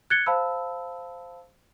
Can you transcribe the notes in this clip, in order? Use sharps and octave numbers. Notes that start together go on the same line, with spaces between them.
F#6 G#6 A6 C#7 G7
C5 F5 A5 B5 E6